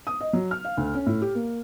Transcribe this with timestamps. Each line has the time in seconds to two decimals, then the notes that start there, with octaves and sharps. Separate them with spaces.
0.07 D#6
0.21 D#5
0.33 F#3
0.51 F6
0.65 F5
0.77 D2
0.95 C#4
1.06 A2
1.22 G4
1.35 A#3